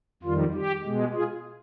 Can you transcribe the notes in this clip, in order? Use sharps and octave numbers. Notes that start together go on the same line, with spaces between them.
F2 D#3 G3 F4
G4
B2 G#3
F4 G#4